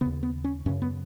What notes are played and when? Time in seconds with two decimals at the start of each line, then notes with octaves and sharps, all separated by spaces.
0.01 D#2 C#3 B3
0.23 B3
0.44 C#4
0.66 F#2 C#4
0.69 C#3
0.82 B3